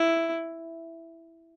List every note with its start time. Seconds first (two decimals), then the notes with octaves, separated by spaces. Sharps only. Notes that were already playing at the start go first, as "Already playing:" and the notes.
Already playing: E4